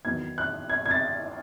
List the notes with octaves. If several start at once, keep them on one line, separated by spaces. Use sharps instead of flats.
E2 D#3 F#3 B3 D#4 G#6
F#6
G#6
G#6
A6